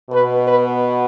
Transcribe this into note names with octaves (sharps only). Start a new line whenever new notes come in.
B2 B3 B4
B4